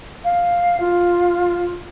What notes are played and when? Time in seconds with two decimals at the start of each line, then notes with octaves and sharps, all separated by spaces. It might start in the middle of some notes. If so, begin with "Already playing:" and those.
0.24 F5
0.80 F4